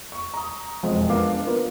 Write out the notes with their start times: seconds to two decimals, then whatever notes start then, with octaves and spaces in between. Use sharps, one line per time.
0.12 C#6
0.34 A#5 D#6
0.83 E1 F2 F3 G#3 C4 G#4
1.09 A#3 B3 D4 F5 D6
1.46 B3 F4 A#4